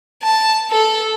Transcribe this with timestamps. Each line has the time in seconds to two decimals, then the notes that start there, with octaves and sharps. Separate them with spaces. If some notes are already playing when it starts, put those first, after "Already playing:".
0.23 A5
0.71 A4